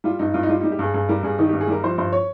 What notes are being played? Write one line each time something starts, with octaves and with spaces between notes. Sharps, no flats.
G3 F4
G2 D#4
G2 F4
D#4
G3 F4
G3 D#4
G4
G2 G#4
G2 G#4
G3 A#4
G2 G#4
D#3 D#4
G2 G4
G#4
G3 A#4
F3 C5
G2 C5
C#5